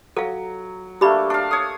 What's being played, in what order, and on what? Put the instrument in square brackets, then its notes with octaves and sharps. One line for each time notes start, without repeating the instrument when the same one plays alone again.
[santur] F#3 [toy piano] A4 F5
[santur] A3 A#3 D4 [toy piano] G4 B5
[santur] D4 F5
C#5 D#6